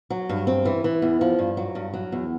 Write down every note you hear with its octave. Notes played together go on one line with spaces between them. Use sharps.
F#3
G2
C4
E3
E3
E2
F3
G2
F#3
G2
F#3
E2